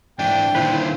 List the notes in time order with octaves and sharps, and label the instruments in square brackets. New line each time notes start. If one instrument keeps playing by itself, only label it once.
[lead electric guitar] G#2 E3 [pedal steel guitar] D4 [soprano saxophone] G5
[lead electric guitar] A#2 D#3 [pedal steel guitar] D3 F4 B4 [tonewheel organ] E4 C5